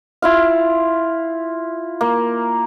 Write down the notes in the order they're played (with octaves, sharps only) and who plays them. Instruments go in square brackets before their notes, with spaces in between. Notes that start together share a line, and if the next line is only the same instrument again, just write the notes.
[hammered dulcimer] E4 F4 F5
A#3